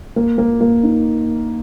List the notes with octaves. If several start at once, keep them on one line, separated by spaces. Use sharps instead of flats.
A#3
A#3
A#3
D#4